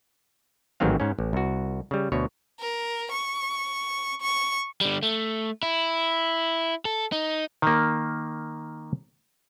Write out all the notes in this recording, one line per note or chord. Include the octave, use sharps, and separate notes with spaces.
A1 G#2 D#3 F#3 C4 F5
G#2 C#4
A1
C2 F#4
C#3 G3
D2 B2 C#5
A#4
C#6
C#6
D3 G3
A3
E4
A4
D#4
D#3 A#3